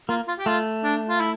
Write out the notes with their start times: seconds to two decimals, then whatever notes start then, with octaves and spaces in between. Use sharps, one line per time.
0.09 A#3 F4
0.27 F4
0.38 G4
0.46 A3 F4
0.83 D4
1.09 F4
1.20 E4